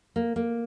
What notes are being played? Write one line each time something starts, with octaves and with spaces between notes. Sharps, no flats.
A#3
A#3